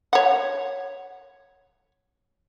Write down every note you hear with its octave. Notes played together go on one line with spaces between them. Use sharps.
C#5 F#5